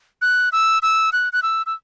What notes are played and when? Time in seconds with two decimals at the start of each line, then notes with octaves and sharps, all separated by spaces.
0.22 F#6
0.52 E6
0.83 E6
1.13 F#6
1.33 F#6
1.43 E6
1.66 E6